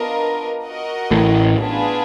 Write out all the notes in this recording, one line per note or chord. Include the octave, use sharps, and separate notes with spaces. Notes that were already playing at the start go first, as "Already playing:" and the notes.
Already playing: B3 D4 F4 A#4 D#5
F#4 A#4 D#5 F#5
A1 A2
B3 D4 F4 G#4 B4